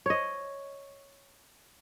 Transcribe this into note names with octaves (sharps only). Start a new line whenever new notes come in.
C#5 D#5